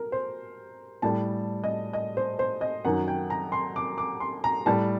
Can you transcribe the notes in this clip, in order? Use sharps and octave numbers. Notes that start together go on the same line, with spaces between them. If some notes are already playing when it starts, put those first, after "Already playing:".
Already playing: A#4
C5
A2 G3 A5
D#5
D#5
C5
C5
D#5
F#2 D#3 F#3 F#5
G5
A#5
C6
D6
D6
C6
A#5
A2 G3 A5